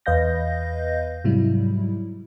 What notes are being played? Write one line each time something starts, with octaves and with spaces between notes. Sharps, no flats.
E2 B4 D#5 F5 G6 A#6
G#2 C3 F#3 G3 E4